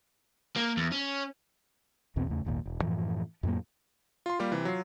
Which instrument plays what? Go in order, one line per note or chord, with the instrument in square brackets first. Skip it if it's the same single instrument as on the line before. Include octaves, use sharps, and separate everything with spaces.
[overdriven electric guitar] A#3
E2
C#4
[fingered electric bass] B1 E2 B2 C4
E2 C#3 A3
G#1 D#2 A#2
E1
F#2 A2 E3 F3
F2 A2 F#3 A#3
[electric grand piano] F4 C6
G3 A#3 F4 G4
C3 E3
F#3 F4 C7